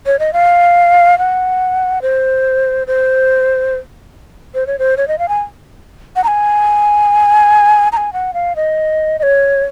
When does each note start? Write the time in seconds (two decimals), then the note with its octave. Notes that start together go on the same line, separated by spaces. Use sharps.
0.06 C#5
0.19 D#5
0.33 F5
1.18 F#5
2.02 C5
2.87 C5
4.55 C5
4.67 C#5
4.79 C5
4.97 C#5
5.08 D#5
5.19 F5
5.29 G#5
6.16 F#5
6.24 A#5
6.28 G#5
7.92 A#5
7.97 G#5
8.13 F#5
8.34 F5
8.56 D#5
9.19 D#5
9.23 C#5